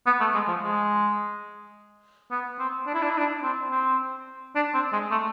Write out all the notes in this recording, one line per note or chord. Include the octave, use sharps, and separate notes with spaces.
B3
A3
G#3
F3
G#3
B3
C4
D4
E4
D4
E4
D4
C4
C4
D4
C4
G#3
A3